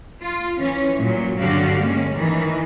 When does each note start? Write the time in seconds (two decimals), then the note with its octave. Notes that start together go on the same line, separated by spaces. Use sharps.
0.22 F4
0.59 E3 C#4
1.00 A#2 F#3
1.39 G2 D3 F#3 F#4 G4 F5
1.80 G#3 A#3 C#4
2.13 D#3 E3